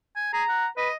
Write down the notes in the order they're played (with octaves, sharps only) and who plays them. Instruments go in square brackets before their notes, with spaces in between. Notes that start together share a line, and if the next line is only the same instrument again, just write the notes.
[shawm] G#5
[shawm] G#4 [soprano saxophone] A#5
[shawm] F#5
[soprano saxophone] B4 [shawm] D#5